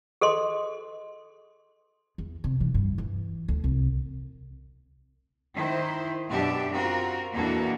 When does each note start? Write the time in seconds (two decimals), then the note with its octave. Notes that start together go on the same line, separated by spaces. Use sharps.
0.21 G#4 A4 D#5 C6
2.18 E2
2.44 C3
2.60 E3
2.74 G2
2.98 E3
3.48 D2
3.64 C2
5.55 D#3 E4 C5
6.29 F#2 B2 D4 G4 E5
6.73 C4 F4 F#4 A#4
7.33 E2 B2 A#3 D4 F#4 A4